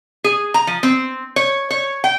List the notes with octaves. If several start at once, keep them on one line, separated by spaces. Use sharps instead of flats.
G#4
A#5
F3
C4
C#5
C#5
G5